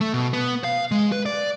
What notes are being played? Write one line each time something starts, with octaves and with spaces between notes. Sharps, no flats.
A3
B2
B3
F5
G#3
B4
D5